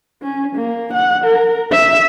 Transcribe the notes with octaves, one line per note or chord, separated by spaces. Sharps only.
C#4
A#3
F#5
A#4
E5